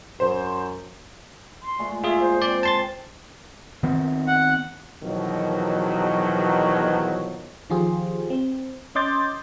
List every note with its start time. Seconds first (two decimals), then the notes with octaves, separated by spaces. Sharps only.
0.20 F#2 C5
1.62 C6
1.79 A#2 G#3 A3
2.04 F4 G#4 E5
2.20 C5
2.42 C4 D5
2.63 A5 C6 A6
3.83 D#3 B3 C4
4.27 F#5
5.03 E2 B2 D#3 F3 F#3
7.70 D#3 F3 F4 G4 G#4 C5
8.30 C4
8.95 C#4 D#5 C6 D6 G6 A6